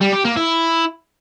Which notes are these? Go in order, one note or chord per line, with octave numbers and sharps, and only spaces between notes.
G3
G4
A#3
E4